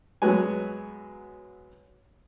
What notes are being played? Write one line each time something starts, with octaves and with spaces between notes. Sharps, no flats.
F#2 F#3 G#3 B3 G#5